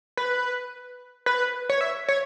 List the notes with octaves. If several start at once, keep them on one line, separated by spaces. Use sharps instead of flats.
B4
B4
C#5
E5
C#5